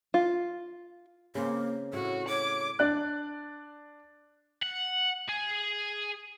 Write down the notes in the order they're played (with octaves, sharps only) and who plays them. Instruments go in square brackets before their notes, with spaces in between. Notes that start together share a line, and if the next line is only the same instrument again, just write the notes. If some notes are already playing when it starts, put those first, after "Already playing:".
[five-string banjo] F4
[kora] C#3 C4 [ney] A#3
[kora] A2 F5 [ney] E4 [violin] F#4
[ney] C#5 [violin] D6
[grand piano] D4 D5 F#6
[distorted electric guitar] F#5
G#4